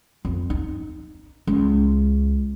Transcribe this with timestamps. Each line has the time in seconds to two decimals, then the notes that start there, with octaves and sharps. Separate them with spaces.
0.25 F2
0.50 D#4
1.47 C#2